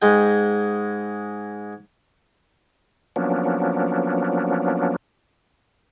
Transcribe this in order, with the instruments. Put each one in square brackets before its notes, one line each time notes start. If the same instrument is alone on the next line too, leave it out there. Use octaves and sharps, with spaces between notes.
[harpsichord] G#2 G#3 G5
[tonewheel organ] F3 F#3 A#3 B3 C#4 D4